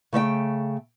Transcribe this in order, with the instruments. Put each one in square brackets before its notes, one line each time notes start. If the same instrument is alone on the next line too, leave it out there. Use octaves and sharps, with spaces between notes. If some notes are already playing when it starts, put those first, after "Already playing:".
[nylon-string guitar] C#3 A3 D#5 G5